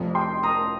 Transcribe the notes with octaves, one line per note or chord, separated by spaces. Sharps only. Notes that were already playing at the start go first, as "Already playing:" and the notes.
Already playing: F1 F2 F3
G5 C6
A#5 D#6